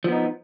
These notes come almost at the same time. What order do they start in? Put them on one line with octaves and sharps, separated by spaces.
F3 B3 D#4